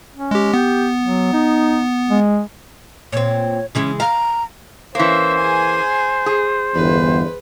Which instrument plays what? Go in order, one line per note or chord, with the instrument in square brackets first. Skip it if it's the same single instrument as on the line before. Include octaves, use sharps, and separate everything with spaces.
[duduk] C#4
[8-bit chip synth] G#3 G4
[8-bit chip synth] B3 [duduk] G4
[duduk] F#3
D#4
G#3
[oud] A#2 C4 [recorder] C#5
[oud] C#3 E3 G#3 [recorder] C#4
[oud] F5 [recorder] A#5
[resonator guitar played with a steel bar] E3 A#3 [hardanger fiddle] C#4 E5 [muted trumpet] C5
[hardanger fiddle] G#4 G#5
[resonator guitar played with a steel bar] G#4
[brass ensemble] G1 E2 [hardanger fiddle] B4